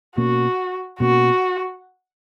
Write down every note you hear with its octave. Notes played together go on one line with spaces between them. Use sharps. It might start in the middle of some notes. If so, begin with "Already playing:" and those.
B2 A#3 C#4 F#4
B2 A#3 C#4 F#4